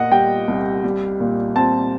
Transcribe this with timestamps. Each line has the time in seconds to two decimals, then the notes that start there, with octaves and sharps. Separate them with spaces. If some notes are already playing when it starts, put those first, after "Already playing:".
Already playing: A#2 A#3 D#5 F#5
0.11 G3 G5
0.48 C2
0.84 G3
1.20 A#2
1.56 C4 A5